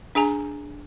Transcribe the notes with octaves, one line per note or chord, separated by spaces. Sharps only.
D4 G#4 G#5 A#5